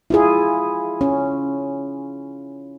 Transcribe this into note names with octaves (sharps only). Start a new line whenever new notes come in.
E4 F4 G#4
C#4